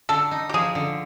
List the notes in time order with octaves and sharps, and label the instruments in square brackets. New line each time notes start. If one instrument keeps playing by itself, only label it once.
[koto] D3 [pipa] A4
[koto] D#4
[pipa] G4
[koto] F3 [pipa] G#4
[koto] D3